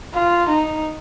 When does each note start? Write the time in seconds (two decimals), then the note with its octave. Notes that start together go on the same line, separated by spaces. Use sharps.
0.14 F4
0.49 D#4